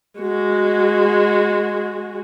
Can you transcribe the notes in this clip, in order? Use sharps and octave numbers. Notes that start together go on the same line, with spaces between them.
G#3 F#4